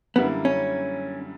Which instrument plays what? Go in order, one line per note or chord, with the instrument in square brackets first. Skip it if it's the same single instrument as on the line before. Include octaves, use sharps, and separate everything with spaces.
[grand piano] F#2 D3 G3 A#3 E4 [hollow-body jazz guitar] B3
[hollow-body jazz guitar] C#4